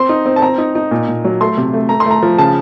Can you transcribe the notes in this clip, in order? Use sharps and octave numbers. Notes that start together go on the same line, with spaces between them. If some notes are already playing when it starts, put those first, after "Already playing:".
Already playing: C4 C6
D#4
C4
A5
C4 A#5
D#4
D#4
A#2
A#2
F#3
A3 C6
C3
A3
A3 A#5
C6
A3 A#5
F3
C#3 A5